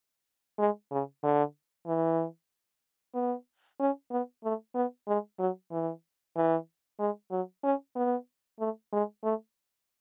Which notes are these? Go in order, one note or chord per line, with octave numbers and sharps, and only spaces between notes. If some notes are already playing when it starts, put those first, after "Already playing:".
G#3
C#3
D3
E3
B3
C#4
B3
A3
B3
G#3
F#3
E3
E3
G#3
F#3
C#4
B3
A3
G#3
A3